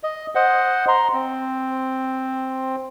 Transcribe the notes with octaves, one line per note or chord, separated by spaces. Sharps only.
D#5
C5 D#5 F#5
A#5 C6
C4